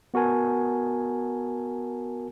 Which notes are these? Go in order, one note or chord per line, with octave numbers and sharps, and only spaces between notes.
B3 F#4 A#4 G#5 A5